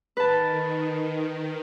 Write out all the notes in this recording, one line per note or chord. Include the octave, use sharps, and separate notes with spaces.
D#3 B4 A5